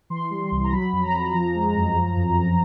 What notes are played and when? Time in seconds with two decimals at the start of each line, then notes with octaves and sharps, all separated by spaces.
0.10 E3 C6
0.30 G3
0.51 C2
0.64 A#5
0.72 F#3 B5
0.93 F2
1.03 A#5
1.14 F2
1.34 F3 A#5
1.55 G#3
1.75 F#2
1.96 F3
2.17 F2
2.37 F2